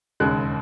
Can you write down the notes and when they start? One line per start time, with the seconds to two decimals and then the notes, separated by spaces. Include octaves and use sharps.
0.20 E1 D#2 C#3 G#3 F#6